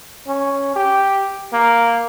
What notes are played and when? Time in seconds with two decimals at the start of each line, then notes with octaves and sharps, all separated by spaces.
0.27 C#4
0.75 G4
1.53 A#3